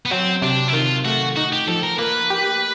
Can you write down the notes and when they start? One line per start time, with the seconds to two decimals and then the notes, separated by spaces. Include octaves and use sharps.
0.06 B3
0.11 F#3 C4
0.42 C3 D4
0.68 E4
0.73 D#3 F4
1.05 A3 F#4
1.36 D#4 F#4
1.52 G4
1.68 F3 A4
1.83 A#4
1.98 A#3 B4
2.30 G4